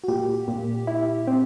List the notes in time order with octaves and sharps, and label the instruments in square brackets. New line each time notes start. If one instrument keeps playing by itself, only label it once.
[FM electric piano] F#4
[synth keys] A#2 [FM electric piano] G4
[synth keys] A#2
E4
C4